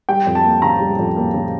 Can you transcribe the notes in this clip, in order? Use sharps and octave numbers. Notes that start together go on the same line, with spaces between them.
G3 G5
F2
A5
A#3
C#3 A#5
G3
F2
A#3
C#3